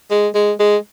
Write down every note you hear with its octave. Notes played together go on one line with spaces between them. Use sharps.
G#3
G#3
G#3